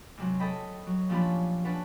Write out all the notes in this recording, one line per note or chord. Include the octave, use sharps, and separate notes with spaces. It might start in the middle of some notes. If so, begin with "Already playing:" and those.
G#2 C3 F#3
A4 D#5 G5 B5
F#3
A#2 F3 C#4 D4 G4 B5
C#4 D4 G4 B4 F#5